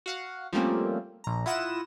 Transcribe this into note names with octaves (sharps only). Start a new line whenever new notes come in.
F#4 F5 F#5
F3 G3 A3 A#3 C4 C#4
A#1 A#5
E4 F4 F#5 D#6 A#6 E7